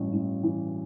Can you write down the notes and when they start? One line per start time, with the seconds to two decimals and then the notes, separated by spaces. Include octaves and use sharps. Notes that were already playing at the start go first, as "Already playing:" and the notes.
Already playing: A1 G2 E3
0.13 A1
0.43 E3